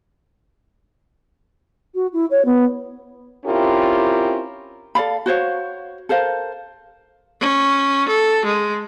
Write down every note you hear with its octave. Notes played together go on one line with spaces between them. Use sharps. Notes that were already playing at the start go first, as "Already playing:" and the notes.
F#4
E4
C#5
B3
C4 C#4 E4 F4 G4 A#4
A4 D5 F5 B5
F#4 C5 C#5 F5
A4 A#4 C5 F5
C#4
A4
G#3